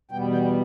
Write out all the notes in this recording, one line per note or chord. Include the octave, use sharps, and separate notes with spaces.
E2 B2 G3 B3 G5
G5